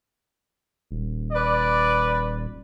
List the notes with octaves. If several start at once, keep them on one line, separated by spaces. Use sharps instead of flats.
D#1
B4 D5